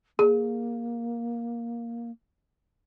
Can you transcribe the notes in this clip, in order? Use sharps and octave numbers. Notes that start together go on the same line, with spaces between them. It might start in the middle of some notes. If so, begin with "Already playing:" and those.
A#3 G#4